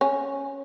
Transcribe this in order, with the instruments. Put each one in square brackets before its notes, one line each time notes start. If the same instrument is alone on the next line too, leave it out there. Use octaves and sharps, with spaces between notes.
[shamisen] C#4